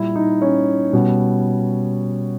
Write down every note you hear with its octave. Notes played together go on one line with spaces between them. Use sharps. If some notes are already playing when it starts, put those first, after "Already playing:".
Already playing: A#2 G3 E4
D#4
C#4
B2 G3